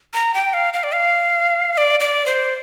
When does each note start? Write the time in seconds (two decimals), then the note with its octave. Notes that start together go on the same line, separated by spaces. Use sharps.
0.14 A#5
0.34 G5
0.53 F5
0.73 F5
0.83 D5
0.93 F5
1.73 F5
1.78 D5
2.00 D5
2.26 C5